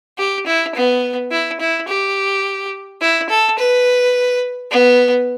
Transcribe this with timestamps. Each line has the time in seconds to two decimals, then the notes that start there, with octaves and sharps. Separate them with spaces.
0.18 G4
0.47 E4
0.75 B3
1.31 E4
1.60 E4
1.88 G4
3.01 E4
3.29 A4
3.58 B4
4.71 B3